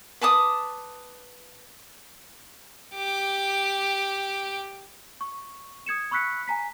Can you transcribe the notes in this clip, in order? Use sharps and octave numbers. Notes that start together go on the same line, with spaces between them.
B4 A5 D6 D#6
G4 D6
C#6
D#6 G#6 C#7 E7
B5 C#6 E6 F#6 B6 C#7
G#5 A#5 B6